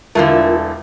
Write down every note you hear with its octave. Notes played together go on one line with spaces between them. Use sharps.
E1 D3 E3 A3 E4 F4 A#4 F5